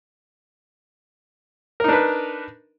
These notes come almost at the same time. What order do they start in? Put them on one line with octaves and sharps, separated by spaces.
A#4 D#4 D4 B4